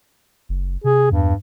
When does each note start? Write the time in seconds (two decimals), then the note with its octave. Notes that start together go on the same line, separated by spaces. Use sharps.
0.49 F#1
0.84 C3 G#4
1.12 E2 G2